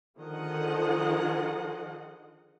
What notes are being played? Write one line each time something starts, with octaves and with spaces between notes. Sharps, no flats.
D3 D#3 F3 G#4 D#5 F#5